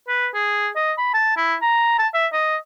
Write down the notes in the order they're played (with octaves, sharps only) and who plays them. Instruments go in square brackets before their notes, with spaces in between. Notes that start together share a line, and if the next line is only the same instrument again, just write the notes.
[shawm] B4
G#4
D#5
B5
A5
E4
A#5
A5
E5
D#5